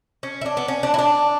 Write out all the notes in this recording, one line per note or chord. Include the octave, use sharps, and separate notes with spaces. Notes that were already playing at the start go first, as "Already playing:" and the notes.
C#4
E4
D4
B3
C#4
D4
E4
D4